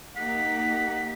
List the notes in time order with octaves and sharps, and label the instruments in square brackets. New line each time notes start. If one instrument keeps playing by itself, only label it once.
[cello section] A#3 D#4 G4 [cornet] F#5 [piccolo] B6